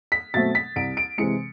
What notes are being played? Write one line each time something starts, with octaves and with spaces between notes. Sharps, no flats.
B6
B2 F#3 A3 C4 A6
B6
C2 D7
D7
C3 E3 G#3 C#7